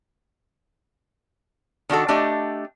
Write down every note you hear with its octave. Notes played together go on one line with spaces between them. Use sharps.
D#3 D4 F#4 A4
A3 D4 G4 D#5